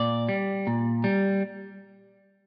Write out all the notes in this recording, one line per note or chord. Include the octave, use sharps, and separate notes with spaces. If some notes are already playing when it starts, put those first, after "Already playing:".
Already playing: A#2 D5
G3
A#2
G3